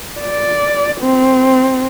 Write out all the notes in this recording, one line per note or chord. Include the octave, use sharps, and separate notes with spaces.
D5
C4